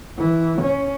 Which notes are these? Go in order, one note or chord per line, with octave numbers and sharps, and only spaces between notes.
E3
C#4